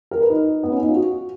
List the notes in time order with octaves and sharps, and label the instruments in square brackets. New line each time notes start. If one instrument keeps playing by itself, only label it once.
[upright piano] A#4
B4
D#4
B3
C#4
D#4
F4
F#4